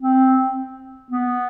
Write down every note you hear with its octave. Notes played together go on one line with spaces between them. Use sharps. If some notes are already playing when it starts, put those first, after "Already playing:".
C4
B3